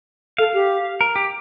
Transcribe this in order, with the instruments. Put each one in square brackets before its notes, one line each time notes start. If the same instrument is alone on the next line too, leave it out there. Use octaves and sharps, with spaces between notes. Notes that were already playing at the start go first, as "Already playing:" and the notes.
[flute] A4 [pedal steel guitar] F5
[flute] G4
[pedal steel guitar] A#4
G4